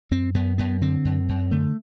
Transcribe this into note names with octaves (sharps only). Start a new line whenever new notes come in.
F#2 C4
F#2 B3
F#2 B3
D3 C4
F#2
F#2
D3 A3